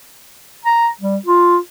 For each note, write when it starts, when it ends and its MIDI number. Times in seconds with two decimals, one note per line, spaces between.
0.65 0.87 82
1.01 1.16 55
1.26 1.57 65